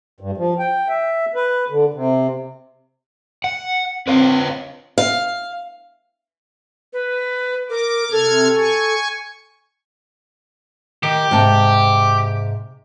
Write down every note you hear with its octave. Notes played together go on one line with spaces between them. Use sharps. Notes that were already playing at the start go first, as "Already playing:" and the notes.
G2
F3
G5
E5
B4
D3
C3
F#5
C4 B4 C#5 F5
F5
B4
A#4 D6
C3 A4 F6 G#6
G#5 C#6
D#3 G4
G#2 C3 A5